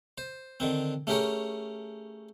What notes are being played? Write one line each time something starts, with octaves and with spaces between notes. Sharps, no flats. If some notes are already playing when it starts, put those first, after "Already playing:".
C5
D3 D#3 C4
A3 C#4 G4 G#4 A#4 C#5